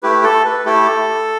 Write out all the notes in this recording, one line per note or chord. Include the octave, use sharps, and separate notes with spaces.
A3 E4 G4 B4
A4
B4
A3 E4 G4 A4